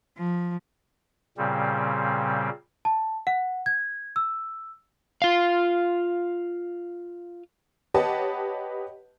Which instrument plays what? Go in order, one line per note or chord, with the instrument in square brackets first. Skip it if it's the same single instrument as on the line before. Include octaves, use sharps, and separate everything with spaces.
[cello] F3
[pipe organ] A#2 C#3 G3 C4
[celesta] A5
F#5
G#6
E6
[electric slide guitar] F4 F5
[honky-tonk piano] G4 B4 C#5 D#5 F#5 A5